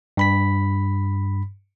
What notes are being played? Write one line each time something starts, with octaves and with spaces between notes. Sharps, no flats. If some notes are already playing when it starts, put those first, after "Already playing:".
G2 B5 B6